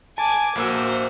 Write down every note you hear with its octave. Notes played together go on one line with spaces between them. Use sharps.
G#5 A5 D6
A#1 A#3 F#4 C5 E6